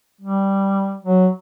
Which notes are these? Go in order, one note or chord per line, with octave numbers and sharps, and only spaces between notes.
G3
F#3